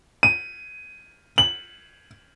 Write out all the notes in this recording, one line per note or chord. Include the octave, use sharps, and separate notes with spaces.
D#7
F#7